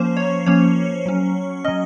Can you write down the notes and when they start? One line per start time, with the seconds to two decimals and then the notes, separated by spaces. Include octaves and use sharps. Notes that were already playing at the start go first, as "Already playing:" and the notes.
Already playing: F3 A#3 C#4 C5
0.17 C#5
0.46 F3 A#3 C#4 C#5
1.06 F#3 C#4
1.64 F#3 C#4 D#5